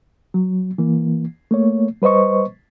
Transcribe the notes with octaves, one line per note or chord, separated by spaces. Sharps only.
F#3
E3 A#3
A3 A#3 C#5
G3 B4 C5 D#5 C#6